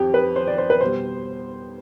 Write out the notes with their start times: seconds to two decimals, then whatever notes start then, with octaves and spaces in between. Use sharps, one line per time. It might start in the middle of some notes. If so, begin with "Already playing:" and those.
Already playing: F2 G4
0.14 B4
0.36 C5
0.47 D5
0.58 C5
0.70 B4
0.81 B2 G3 C5